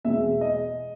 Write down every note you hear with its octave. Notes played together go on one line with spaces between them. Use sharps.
E2 B2 G#3 E5
D#5